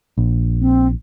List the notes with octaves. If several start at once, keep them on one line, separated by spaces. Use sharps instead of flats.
A#1
C4